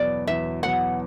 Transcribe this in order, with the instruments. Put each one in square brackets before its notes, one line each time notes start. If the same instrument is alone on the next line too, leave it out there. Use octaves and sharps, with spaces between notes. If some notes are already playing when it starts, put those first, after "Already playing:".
Already playing: [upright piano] E2 B2 F#3 B3 [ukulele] D5
[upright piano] E2 [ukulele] E5
[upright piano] B2 F#3 B3 [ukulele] F#5